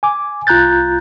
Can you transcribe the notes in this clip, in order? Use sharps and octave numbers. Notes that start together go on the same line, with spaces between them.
G#5 D6
C2 F4 A#5 F#6 G6 A6